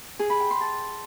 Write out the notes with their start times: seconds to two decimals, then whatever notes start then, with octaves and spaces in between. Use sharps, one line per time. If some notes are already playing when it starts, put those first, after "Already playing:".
0.19 G#4
0.30 B5
0.40 G5
0.51 C6
0.61 A5